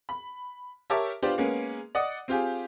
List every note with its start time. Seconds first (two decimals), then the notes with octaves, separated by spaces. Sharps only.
0.09 B5
0.90 G4 A#4 C#5 E5 A5 D6
1.22 B3 D4 F4 G4 C5 D5
1.38 G#3 A#3 B3 C#4
1.95 D5 D#5 F#5 D#6
2.28 C4 F4 G4 G#4